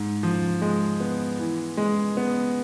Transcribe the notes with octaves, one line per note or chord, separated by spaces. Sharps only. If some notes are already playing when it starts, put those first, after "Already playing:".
Already playing: G#2
F3
G#3
B3
E3
G#3
B3